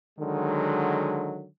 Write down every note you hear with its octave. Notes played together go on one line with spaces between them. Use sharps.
D3 D#3 F#3 G#3